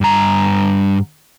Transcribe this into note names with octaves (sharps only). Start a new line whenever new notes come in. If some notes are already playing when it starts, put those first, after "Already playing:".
G2 A#5